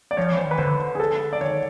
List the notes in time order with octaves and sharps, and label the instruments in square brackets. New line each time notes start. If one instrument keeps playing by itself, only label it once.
[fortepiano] D5
[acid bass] F3 [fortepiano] C#5
[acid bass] E3
[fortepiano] C5
[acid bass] D#3
[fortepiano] B4
[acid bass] D3 [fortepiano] C5
[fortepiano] G#4
A4
D5
[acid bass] D#3 [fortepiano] C#5